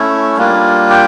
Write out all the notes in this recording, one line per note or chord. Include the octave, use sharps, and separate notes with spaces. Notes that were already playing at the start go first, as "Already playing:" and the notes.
Already playing: A3 C#4 E4
G3 A#3 D4 F4
G4 G5